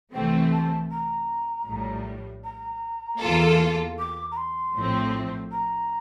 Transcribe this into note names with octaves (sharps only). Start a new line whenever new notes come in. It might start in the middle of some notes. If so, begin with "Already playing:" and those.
C2 C3 E3 A3 C4 G5
A5
A#5
A#1 A2 G3
A#5
E2 E3 A#3 F4 A4
D6
A#5
C6
A#1 A2 F3 A3 C4
A#5